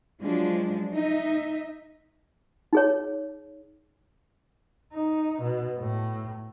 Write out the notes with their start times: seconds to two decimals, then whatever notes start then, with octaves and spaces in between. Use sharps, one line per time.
0.21 F3 F#3 G#3 D4
0.93 D#4 D#5 E5
2.73 D#4 G#4 C#5
4.94 D#4
5.42 B2
5.79 A2